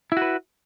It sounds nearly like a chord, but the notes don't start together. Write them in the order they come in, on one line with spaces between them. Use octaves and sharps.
E4 F#4 B4